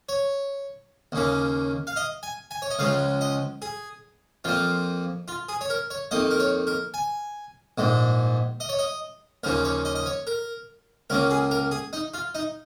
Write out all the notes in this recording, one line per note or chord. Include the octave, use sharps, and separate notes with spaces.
C#5
D#2 C#3 A#3
F5
D#5
G#5
G#5
C#5
D#5
C#2 C#3 F3 G#3 F5
D#5
G#4
F2 F3 A#3 F4
F4
G#4
C#5
A#4
C#5
F2 D#3 A#3 D#5
A#4
C#5
A#4
G#5
A#1 G#2 G#3
D#5
C#5
D#5
D#2 C#3 F3 A#3 A#4
C#5
D#5
D#5
C#5
A#4
C#2 C#3 A#3 A#4
G#4
A#4
G#4
D#4
F4
D#4